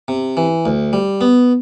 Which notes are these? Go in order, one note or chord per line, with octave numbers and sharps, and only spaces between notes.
C3
E3
D2
G3
B3